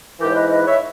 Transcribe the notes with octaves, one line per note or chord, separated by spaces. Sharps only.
G#2 E3 G4 A#4
C#5
B4 D#5
B4 D#5
C#5 E5